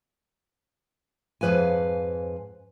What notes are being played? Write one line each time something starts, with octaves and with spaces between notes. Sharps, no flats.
F2 G#2 F3 B4 F5 G#5